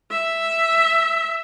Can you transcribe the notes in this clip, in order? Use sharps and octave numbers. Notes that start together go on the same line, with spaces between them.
E5